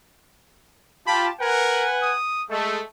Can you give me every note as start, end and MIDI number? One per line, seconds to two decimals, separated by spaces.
1.07 1.28 65
1.07 1.28 67
1.07 1.28 81
1.07 1.29 83
1.41 1.87 70
1.41 2.12 71
1.41 2.12 78
1.41 2.12 80
2.02 2.44 87
2.50 2.78 56
2.50 2.78 57
2.50 2.86 69